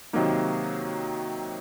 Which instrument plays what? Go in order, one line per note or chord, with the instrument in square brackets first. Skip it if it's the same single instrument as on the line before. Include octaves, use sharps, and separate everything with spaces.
[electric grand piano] C3 D#3 F#3 A#3 D#4